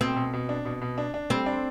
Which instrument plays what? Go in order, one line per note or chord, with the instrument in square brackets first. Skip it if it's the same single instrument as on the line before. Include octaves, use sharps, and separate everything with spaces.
[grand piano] B2 [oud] C4
[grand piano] B2
B2
D4
B2
B2
D4
D4
[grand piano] G3 [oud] C4
[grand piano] D4